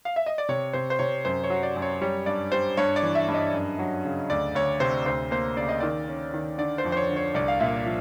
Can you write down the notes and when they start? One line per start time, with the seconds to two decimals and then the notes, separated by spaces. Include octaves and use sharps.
0.05 F5
0.16 E5
0.26 D#5
0.38 D5
0.49 C3 C#5
0.73 C3 C5
0.90 C5
0.99 C3 C#5
1.25 F#2 C5
1.44 C#5
1.50 F#3
1.63 D5
1.76 F#2
1.82 C#5
2.01 G3 C#5
2.26 G2 D5
2.52 G3 C5
2.77 G2 C#5
2.96 D5
3.03 E3
3.15 E5
3.28 G2
3.34 D#5
3.53 F#2
3.79 F#3
4.05 C#3
4.30 D2 D5
4.55 D2 C#5
4.80 C3 C5
5.06 D2 C5
5.31 A#3 C5
5.57 C#3 D5
5.69 D#5
5.80 D#3 D5
6.08 C#4
6.34 D#3
6.58 D3 D5
6.78 C5
6.85 F2
6.92 C5
6.97 C#5
7.09 D3
7.16 C#5
7.34 C2 D5
7.48 F5
7.60 A#2 E5
7.85 F3